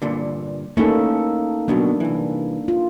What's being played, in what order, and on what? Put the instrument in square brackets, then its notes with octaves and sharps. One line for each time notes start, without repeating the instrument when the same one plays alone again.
[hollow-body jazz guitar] G2 A#2 D3
[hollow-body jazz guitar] A3 C#4 E4 [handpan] A#3 D#4 A4
[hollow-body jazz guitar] D2 B2 F#3 [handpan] A#3 D4
[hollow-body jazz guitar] C2 E3
[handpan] F4